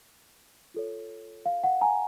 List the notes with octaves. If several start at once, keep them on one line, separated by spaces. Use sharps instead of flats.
F4 A4 C#5
F5
F#5
G#5 A#5